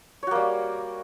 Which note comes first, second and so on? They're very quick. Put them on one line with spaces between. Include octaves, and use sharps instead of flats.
C#5 F#4 A#3 G3